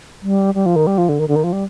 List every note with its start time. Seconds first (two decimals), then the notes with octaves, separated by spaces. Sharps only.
0.22 G3
0.54 G3
0.66 F3
0.76 D#3
0.87 G3
0.98 F3
1.09 D3
1.19 D#3
1.28 D3
1.36 D#3
1.44 F3
1.53 G3